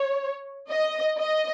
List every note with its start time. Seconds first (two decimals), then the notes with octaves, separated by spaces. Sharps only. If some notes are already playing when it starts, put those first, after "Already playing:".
Already playing: C#5
0.71 D#5
1.18 D#5